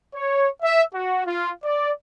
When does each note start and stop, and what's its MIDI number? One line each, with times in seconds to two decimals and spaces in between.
0.14 0.48 73
0.62 0.82 76
0.94 1.22 66
1.26 1.49 65
1.64 1.91 74